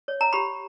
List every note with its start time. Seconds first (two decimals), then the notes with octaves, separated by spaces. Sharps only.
0.08 C#5
0.21 A#5
0.33 G4 B5